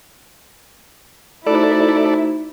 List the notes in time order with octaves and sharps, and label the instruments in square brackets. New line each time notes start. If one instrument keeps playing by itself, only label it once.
[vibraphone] A3 F#4 C5 [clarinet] D#4 [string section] E4 [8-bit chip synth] A4 D5